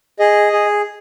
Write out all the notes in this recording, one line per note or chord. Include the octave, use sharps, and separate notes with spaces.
G#4 D#5
G#4